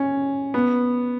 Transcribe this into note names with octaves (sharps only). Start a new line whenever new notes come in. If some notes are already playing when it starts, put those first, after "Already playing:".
Already playing: C#4
B3